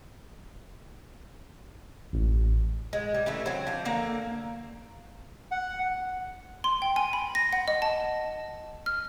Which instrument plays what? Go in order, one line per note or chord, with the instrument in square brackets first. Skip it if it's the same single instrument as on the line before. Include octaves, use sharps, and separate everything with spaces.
[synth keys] A1
[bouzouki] G#3
G3
C#3 E3 A3 D4
F#3 C4
F3 D4
D3 A#3 A#5
[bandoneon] F#5
[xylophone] C6
G5
G#5
B5
A#6
F#5
D#5
A5
F6